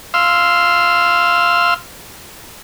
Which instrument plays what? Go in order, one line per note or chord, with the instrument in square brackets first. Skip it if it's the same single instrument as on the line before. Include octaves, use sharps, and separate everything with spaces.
[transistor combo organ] F5 C6 E6